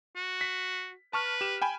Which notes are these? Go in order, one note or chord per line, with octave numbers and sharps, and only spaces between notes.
F#4
B6
B4 A5 C#6 F6
G4 E7
G5 G#5 B5